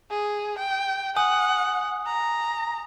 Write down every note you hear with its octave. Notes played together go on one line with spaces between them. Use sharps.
G#4
G5
F#5 G#5 D#6
A#5